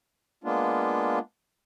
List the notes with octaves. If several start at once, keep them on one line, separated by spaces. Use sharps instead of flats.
G#3 A#3 B3 D4 F4